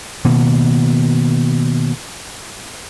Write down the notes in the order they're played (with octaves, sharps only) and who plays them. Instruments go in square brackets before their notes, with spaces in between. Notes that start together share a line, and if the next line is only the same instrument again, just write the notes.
[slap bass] B2 D#3 A#3